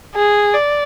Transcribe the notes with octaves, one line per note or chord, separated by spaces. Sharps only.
G#4
D5